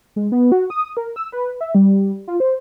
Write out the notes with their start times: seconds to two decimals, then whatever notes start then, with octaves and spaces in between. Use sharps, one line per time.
0.16 G#3
0.32 B3
0.52 F#4
0.70 D#6
0.97 A#4
1.16 E6
1.32 B4
1.61 E5
1.75 G3
2.28 F4
2.40 C5